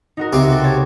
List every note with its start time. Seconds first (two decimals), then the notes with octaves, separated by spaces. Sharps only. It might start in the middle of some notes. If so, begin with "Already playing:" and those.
0.17 D#4 F#4 A#4
0.33 C#2 C3 G4
0.48 F#4 A4
0.64 C#5 G#6 A6